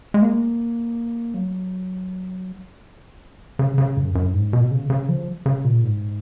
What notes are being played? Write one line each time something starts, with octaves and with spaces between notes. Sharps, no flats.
G#3
A#3
F#3
C#3
C#3
F#2
F#2
G#2
B2
C#3
C#3
F3
C#3
A#2
G#2